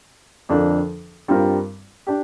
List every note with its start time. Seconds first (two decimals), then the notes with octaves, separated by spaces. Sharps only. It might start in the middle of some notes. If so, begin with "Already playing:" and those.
0.49 F2 D3 F3 D4 A#4
1.28 G2 G3 C4 F4 A#4
2.07 D4 G4